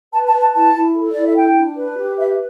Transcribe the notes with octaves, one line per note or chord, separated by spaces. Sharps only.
B4 A5
A5
B4
A5
E4 A5
E4
A4
E4 D5
E5
D4 G5
D4
B4
G4
B4 E5